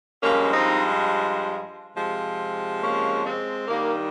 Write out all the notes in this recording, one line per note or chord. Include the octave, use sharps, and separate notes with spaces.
G2 F3 G#3 A#3 C#4
C4 D#4
C3 F3 G#3
A#3 C#4
G#3 C4
G2 D#3 G3 A#3